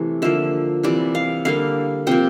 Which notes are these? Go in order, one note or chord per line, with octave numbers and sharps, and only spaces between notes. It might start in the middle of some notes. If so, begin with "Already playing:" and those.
Already playing: C3 E3 A3
D3 F3 A#3 E5
C3 E3 G3 D5
F5
D3 G3 A#3 F5
C3 F3 A#3 G5